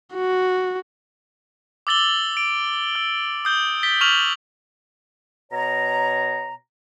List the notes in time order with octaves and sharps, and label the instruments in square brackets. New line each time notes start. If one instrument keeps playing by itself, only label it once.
[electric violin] F#4
[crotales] D6 E6 A6 F#7 G7
D7
E6
D#6 G6 G7
A6 B6 G7
C#6 F6 F7 F#7
[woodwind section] B2 C#5 A#5